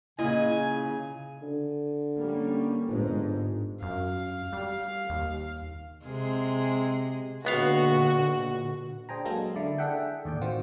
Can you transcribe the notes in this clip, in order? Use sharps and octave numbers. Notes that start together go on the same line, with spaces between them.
A#2 C#3 E4 D#5 G#5
D3
G3 A#3 C#4
G1 G#2
F#2 F5
G3
D#2
C3 G#3 G#4
C#2 A#2 D3 B3 F#4 F5
D4 G#4 C5 G5 G#5 A#5
F#3 G#3 A#3 A4 A#4 F5
D3 E4 D5
D4 G#4 A4 E5 F#5 G5
D#2 A2 D5 G5
A2 D#3 C4 F4 F#4